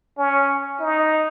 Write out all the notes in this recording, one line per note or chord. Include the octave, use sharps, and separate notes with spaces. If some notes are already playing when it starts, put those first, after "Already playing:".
C#4
D#4